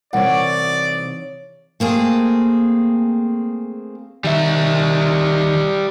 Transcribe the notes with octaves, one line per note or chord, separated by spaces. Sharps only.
C2 E3 D#4 B4 C#5 D5 F#5
A3 A#3 C4 G#4
D#3 G3 E5